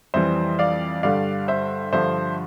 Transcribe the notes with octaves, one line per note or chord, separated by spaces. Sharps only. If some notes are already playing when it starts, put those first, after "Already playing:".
F2 E3 G3 C5 E5
D5 F5
G2 D3 G3 D5 F5
C5 E5
G2 D3 F3 C5 E5